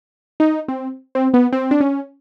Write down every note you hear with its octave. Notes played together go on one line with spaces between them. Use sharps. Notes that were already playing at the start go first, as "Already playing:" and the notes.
D#4
C4
C4
B3
C4
D4
C#4